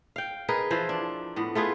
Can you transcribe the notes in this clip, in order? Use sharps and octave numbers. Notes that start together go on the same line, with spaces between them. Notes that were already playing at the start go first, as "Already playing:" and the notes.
F5 G5
D#4 G#4 A#4 B4
E3 F3 F4 C5
D4
A2 B3
A3 F4 G#4 B4